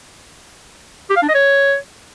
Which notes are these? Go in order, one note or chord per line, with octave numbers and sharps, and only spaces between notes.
G4
F5
D4
D#5
C#5